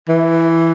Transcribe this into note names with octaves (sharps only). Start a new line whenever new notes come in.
E3